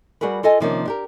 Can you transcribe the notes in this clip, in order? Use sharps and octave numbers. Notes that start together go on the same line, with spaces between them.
G3 F#4 G#4 A#4 B4
F4 A4 D#5 G#5
C3 D#3 F3 A#3 C#4 D4
D4 G4 A#4